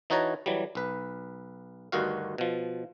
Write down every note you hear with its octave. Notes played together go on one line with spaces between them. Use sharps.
E3 D#4 F#4 C#5 A5 A#5
E3 F#3 G3
B1 B4
D2 G2 D#3 F#4 F5
B2 F3